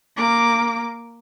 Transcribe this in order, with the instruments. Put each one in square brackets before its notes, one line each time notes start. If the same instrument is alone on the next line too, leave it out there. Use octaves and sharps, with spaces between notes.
[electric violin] A#3 D6